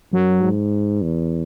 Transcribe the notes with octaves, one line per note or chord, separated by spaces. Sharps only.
F#2 F#3
G#2
E2